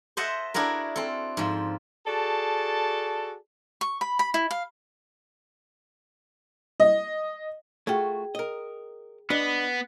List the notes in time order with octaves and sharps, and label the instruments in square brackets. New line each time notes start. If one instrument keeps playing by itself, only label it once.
[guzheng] C5 D#5 E5 F#5 A5
D4 E4 F#4 G#4 A#4
C4 A4
G#2 F3
[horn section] F#4 G#4 A4 D5 A5
[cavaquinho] C#6
B5
B5
E4
F5
[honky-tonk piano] D#5
[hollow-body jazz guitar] A3 F4 F#4 [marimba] G#4 G5
[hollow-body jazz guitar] A#4 D#5
[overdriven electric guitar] B3 [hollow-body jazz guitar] D4 B4 D#5